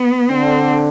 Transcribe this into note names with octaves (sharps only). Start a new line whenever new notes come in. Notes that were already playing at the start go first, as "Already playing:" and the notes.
Already playing: B3
D3 C4